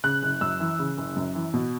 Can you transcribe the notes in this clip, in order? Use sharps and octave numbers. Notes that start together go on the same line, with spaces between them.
C#3 F#6
F#1
F#2 E6
E3
C#3
F#1
F#2
E3
B2